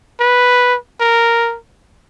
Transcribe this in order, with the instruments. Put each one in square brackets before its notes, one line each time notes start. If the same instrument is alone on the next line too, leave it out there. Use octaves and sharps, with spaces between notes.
[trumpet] B4
A#4